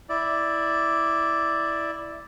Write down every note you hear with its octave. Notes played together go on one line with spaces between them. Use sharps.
E4 D5